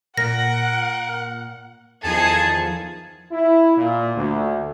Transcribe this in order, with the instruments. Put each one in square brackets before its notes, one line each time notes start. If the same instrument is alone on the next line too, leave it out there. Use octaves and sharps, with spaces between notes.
[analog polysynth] A#2 [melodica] A#4 [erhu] F#5 [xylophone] A#6
[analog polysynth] E2 D#3 F3 [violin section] D#4 G#4 A4 [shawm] A5 [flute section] G#6
[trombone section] E4
A#2
D2